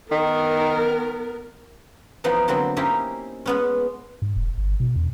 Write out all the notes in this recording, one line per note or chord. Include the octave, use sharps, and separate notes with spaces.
D#3 B3 A#4
E3 F3 B3 D#4
D3 F#3 A#3 C4 E4
A#3 C4 C#4 D#4 E4 G4
G#3 B3 C#4
G#2
E1
G1
B2
E2